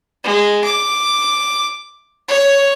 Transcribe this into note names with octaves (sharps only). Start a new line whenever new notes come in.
G#3
D6
C#5